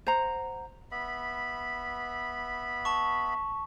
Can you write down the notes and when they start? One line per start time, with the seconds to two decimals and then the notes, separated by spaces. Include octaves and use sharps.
0.07 C5 F#5 A#5
0.92 B3 E5 B5
2.85 A5 C#6